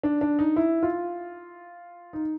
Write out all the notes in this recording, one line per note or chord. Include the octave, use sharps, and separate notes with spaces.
D4
D4
D#4
E4
F4
D#4